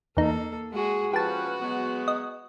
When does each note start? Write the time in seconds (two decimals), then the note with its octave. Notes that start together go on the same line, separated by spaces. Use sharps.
0.17 E2 A#3 D#4 A4
0.72 G#3 F#4 G#4
1.13 F3 C#4 F#4 G4 B4 A5
1.61 F#3 G#3 B3
2.08 D#5